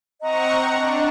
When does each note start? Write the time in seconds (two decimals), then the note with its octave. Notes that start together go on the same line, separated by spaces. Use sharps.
0.22 C4 D#5 F#5 A#5 C#6
0.69 D4